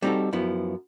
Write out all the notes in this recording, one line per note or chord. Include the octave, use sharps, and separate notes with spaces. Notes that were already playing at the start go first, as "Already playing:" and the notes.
G3 C4 D#4 F4 F#4 A4
F#2 F3 B3 E4